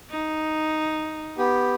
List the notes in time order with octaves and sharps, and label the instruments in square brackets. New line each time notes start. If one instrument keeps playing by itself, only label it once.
[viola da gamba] D#4
[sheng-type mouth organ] B3 G4